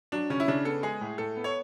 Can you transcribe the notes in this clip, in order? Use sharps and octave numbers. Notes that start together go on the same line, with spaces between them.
F#3 D4
C#3 C#4
E4
C#3 D4
B3 A4
G#3 G#4
A2
A2 A4
B3
C#5